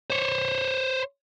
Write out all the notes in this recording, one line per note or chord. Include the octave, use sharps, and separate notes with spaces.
C5 C#5